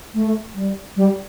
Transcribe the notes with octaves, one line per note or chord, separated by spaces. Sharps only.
A3
G3
G3